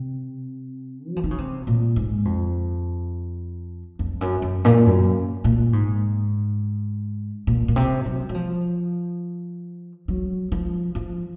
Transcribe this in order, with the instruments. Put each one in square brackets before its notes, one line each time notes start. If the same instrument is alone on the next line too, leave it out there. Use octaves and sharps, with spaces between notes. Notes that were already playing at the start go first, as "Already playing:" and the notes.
Already playing: [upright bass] C3
F#3
F3
D#3
C#3
C3
A#2
G#2
F2
F2
F#2
F#2
A#2
F#2
A#2
G#2
A#2
A#2
C3
F#3
F#3
F3
F#3
F3
F3